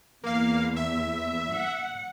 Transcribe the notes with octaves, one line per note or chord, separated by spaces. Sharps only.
E2 A#3 F5
E5
F#5